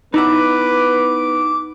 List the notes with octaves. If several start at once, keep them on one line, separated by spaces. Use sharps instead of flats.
B3 D#4 E4 B4 F#5 D6